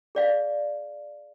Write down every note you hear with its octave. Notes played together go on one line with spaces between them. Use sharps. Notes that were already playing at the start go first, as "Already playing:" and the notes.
G#4 D5 F5